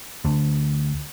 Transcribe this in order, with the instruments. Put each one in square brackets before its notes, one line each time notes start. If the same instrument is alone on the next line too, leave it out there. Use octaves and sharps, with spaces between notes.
[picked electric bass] D2